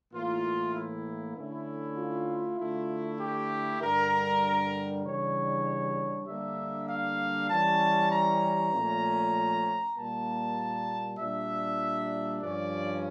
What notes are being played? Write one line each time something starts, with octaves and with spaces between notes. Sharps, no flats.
A2 E3 A#3 F4
E4
D3 A3 C#4 E4
F4
D3 A3 E4
G4
G2 D3 G3 A#4
C#3 E3 G3 D4 C#5
D3 G3 A#3 D4 E5
F5
E3 G3 C#4 A5
A#5
A#2 F3 A3 C#4
A#2 G3 A#3 A5
A#2 G3 D4 E5
G2 F3 C#4 D5